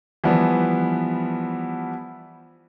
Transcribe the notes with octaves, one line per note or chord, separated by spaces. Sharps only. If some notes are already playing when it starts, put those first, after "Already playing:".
E3 F3 G3 B3